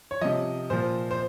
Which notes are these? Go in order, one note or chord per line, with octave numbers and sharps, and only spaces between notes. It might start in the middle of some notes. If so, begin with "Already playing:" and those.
C#5
C3 F3 D#5
A#2 F3 C5
C5